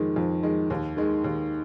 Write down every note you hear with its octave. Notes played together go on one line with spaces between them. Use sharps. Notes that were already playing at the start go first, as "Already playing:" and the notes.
Already playing: F2 D#3 G#3
F2
D#3 G#3
D#2
D#3 G#3
D#2